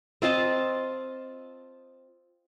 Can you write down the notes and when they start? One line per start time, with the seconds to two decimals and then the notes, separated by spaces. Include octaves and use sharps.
0.22 C4 F4 D#5 A5